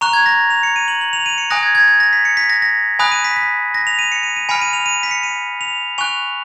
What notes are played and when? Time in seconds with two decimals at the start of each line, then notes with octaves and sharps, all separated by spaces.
0.01 A#5 C#6 F#6 F7
0.13 G#6
0.26 A#6
0.39 A#6
0.50 F7
0.63 C#7
0.76 D#7
0.88 F#7
1.01 F#7
1.13 F7
1.26 D#7
1.38 C#7
1.50 G#5 D#6 F#6 A#6
1.63 G#6
1.75 G#6
1.88 G#6
2.00 A#6
2.13 B6
2.25 C#7
2.37 B6
2.50 A#6
2.62 A#6
2.99 G#5 B5 D#6 F#6
3.12 D#7
3.25 B6
3.37 B6
3.74 A#6
3.87 F7
3.99 D#7
4.12 C#7
4.23 D#7
4.36 D#7
4.49 G#5 B5 F6 C#7
4.61 D#7
4.73 F7
4.86 D#7
5.03 B6
5.11 C#7
5.23 D#7
5.61 F7
5.98 G#5 C#6 F#6 F7